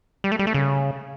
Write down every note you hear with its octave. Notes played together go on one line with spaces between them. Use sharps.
G3
A3
G3
A3
C#3